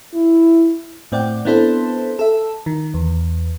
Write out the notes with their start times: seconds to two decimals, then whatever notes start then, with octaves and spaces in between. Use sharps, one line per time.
0.14 E4
1.12 A2 C4 D5 F#5 G5
1.45 B3 C4 D4 E4 A4 C5
2.19 A4 E5
2.66 D#3
2.94 E2